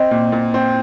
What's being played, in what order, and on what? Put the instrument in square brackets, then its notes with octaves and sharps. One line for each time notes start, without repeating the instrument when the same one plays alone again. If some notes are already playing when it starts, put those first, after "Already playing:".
Already playing: [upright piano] C4 [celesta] D#5
[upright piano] A#2
A#2
C4